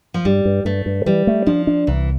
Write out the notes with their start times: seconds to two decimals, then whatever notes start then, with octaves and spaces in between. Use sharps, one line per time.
0.14 F3
0.25 G2 G3
0.45 G2
0.65 G2 A3
0.86 G2
1.06 E3 G3
1.27 A3
1.47 F3 D4
1.67 D4
1.87 C2 E3